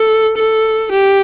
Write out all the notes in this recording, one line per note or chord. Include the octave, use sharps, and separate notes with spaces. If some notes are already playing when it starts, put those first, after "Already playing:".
Already playing: A4
A4
G4